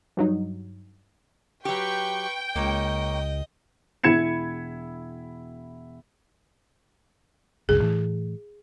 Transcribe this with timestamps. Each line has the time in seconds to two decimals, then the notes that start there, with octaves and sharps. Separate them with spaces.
0.17 G2 F#3 D#4
1.65 F#3 G4 B4 G5 C#6
2.56 C#2 A#3 C#5 D#5
4.04 E1 E4 B5 G#6 C#7 E7
7.69 F#1 C2 F#2 G#4
7.82 A2 E3 A3